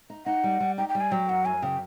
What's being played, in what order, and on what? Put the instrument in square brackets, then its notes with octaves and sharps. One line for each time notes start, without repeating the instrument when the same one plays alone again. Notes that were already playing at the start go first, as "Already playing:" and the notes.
[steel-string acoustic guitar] D#4
[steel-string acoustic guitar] D#4 [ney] F#5
[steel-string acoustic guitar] G3
G3
[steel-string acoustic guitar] D#4 [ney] G5
[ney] G5
[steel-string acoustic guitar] G3
[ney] G#5
[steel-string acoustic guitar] F#3 [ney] G5
[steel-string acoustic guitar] F#2 [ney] F#5
[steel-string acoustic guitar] F#2 [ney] G#5
[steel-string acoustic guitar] C#3 [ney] G5